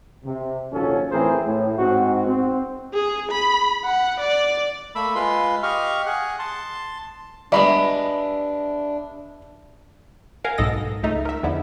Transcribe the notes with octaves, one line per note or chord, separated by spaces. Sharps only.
C3
A#1 D#2 F3 F#3 C#4 A4
A2 E3 C4 G#4 A#4 C5
A2
G#2 C4 F#4
C4
G#4
B5
F#5
D5
A3 A#3 E5 B5
G#3 F4 B4 C6
G4 D#5 F5 C#6 F6
G#4 F#5 F#6
A5 C6
G3 G#3 B3 D4 D#5 E5 B5
A#4 F5 F#5 G#5
B1 G#2 A4 D#5 D#6 A#6
C#2 A3 D#4 A#5
A#4 E5
E2 D3 F3 D#4 E4